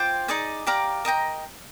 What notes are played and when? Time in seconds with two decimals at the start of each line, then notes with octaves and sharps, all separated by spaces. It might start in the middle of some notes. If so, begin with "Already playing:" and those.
Already playing: F4 C5 G5 D6
0.28 D#4 G#4 D5 G#5
0.67 G4 D5 F5 A#5
1.05 A#4 D#5 G5 A#5